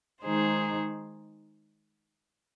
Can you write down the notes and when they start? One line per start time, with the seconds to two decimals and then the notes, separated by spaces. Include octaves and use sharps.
0.23 D#3 G#3 D#4 G#4 C5